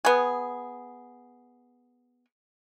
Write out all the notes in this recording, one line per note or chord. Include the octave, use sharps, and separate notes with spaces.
B3 G#4